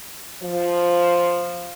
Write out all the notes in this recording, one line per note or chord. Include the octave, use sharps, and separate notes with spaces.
F3